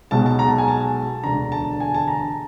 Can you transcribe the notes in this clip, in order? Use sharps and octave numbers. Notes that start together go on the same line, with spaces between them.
B1 B2 G#3 A5
A5
A#5
A5
G#5
A5
E1 D2 D3 A#5
A5
G#5
A5
A#5